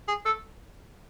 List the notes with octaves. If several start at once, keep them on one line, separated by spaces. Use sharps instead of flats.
G#4
A4